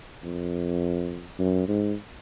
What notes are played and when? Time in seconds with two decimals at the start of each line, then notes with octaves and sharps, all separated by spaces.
0.24 F2
1.39 F#2
1.68 G#2